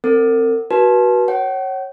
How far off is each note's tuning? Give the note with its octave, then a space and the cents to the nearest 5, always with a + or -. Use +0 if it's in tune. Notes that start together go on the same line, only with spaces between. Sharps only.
C4 +0 A#4 -45
F#4 +15 B4 -30 A5 -30
C#5 -20 F#5 +40